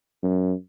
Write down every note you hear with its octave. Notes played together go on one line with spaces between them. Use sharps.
F#2